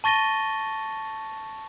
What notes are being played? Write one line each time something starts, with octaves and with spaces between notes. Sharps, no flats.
A5 C#6 A6 A#6 D#7 G7